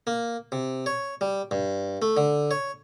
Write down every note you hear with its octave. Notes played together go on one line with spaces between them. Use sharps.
A#3
C3
C#5
G3
G2
A3
D3
C#5